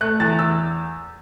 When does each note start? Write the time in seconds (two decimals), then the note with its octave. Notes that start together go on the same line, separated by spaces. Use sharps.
0.01 A3 F#6
0.20 E2 A6
0.39 E2 E6